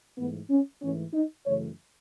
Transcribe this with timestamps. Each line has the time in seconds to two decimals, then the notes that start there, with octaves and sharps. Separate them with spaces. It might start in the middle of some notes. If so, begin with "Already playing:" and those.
0.17 G#2 E3 A3 B3
0.50 C#4
0.82 G#2 E3 A3 C#4
1.14 D#4
1.46 F#2 C#3 E3 A3 C#5